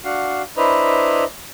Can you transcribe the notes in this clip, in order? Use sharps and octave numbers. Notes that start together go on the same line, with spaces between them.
D4 F#4 F5 F#5
D4 E4 B4 C5 D#5 A#5